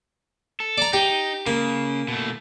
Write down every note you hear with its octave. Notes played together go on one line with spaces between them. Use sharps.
A4
D5 A#5
D#4 G4
C#3 A#3
B2 A3